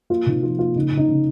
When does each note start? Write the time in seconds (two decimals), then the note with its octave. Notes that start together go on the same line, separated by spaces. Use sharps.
0.10 A#3 F4
0.26 C3 D#4
0.43 F3 F4
0.59 A#3 F4
0.76 C#3 D#4
0.92 C#3
0.97 D#4
1.08 C#3